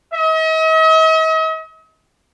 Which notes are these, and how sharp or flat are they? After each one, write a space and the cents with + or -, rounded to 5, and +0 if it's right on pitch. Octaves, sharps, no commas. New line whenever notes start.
D#5 +45